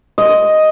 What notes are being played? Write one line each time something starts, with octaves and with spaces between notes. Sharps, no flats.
D#5